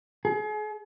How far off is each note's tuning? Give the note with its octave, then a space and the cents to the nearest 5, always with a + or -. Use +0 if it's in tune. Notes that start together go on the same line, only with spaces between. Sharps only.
G#4 +35